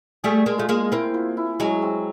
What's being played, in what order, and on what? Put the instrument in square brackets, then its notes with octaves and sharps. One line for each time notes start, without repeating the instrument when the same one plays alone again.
[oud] G3 A3 [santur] G#4
[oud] G#3 A#3
[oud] A3 [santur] F4
[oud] G#3 A#3
[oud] A#3 C4 [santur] E4
[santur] F4
E4
[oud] F#3 G#3 [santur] C#4
[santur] C4